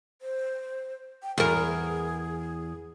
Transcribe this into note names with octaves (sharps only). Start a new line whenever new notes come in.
C5
G5
E2 G#4 A#4